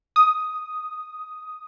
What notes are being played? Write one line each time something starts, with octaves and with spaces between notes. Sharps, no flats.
D#6